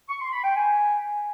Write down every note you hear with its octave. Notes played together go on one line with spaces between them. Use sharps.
C#6
C6
B5
G5
G#5